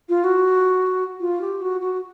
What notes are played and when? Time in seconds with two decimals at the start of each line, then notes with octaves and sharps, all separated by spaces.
0.09 F4
0.24 F#4
1.20 F4
1.41 G4
1.62 F#4
1.81 F#4